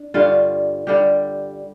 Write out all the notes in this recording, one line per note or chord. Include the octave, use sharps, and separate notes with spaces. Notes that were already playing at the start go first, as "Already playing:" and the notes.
Already playing: D4
G2 D3 G3 F4
G2 D3 G3 G4